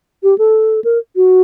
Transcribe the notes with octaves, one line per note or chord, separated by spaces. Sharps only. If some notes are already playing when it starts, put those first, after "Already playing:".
G4
A4
A#4
F#4